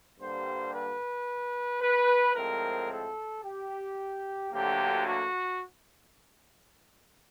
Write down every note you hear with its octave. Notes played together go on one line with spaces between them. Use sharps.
G2 D3 G3 A#3 C5
B4
B4
A2 F3 G#3 C4 A#4
A4
G4
D2 D3 F#3 A#3 G4
F#4